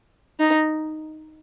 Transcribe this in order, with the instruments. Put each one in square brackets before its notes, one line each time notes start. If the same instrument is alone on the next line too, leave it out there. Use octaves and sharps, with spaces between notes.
[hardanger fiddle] D#4